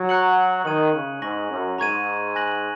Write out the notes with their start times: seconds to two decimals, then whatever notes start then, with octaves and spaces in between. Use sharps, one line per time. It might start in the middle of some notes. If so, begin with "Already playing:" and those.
Already playing: F#3
0.09 A#5 F#6 C#7 F#7
0.65 D#3 C#6 G#6 D#7 F#7
0.94 C#3
1.22 G#2 G#5 C#6 A#6 F#7
1.51 F#2
1.78 G#2 A#5 C#6 G#6 D#7
2.35 G#5 F#6 A#6 F#7